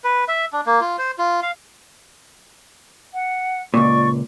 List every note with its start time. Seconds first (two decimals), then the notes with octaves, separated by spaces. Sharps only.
0.04 B4
0.28 E5
0.53 D4
0.66 A#3
0.81 F4
0.98 C5
1.18 F4
1.42 F5
3.14 F#5
3.74 C#2 A#2 D5 C#6